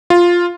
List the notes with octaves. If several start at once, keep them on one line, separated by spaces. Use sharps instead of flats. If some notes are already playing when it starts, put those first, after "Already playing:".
F4